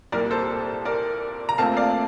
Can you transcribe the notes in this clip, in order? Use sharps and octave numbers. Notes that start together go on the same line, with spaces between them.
C2 A#2 G3 A#4 D5
A4 C5
A#4 D5
A#5
A#1 A#2 A3 C4 F5 A5
D5 F5